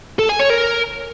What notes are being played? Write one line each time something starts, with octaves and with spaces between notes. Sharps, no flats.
A4
G#5
C#5
A#4